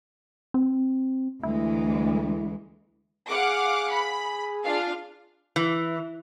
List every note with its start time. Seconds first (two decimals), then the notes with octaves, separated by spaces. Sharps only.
0.54 C4
1.43 D2 E3 G#3 E4
3.28 G#4 F5 F#5 D6
3.89 B5
4.63 D4 F4 F5
5.56 E3